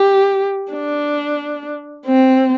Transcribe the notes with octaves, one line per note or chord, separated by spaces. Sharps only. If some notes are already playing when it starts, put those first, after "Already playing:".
Already playing: G4
D4
C4